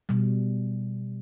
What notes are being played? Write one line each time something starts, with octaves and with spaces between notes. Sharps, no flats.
B2 G3